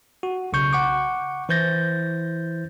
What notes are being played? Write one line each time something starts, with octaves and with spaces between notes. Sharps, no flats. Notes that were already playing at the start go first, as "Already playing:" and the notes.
F#4
B1 C#3 C#6 G6
F#5 C#6 D6
E3 E4 C5 G6 A6 A#6